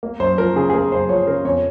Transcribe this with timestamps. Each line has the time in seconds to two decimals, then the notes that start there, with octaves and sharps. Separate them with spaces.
0.03 A#3
0.20 F#2 C5
0.38 F3 A#4
0.56 C#3 G#4
0.70 G#4
0.73 A#3 A#4
0.92 F#2 C5
1.09 F3 C#5
1.27 C#3 A#4
1.45 F2 C#5